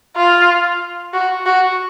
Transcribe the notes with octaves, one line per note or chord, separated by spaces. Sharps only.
F4
F#4
F#4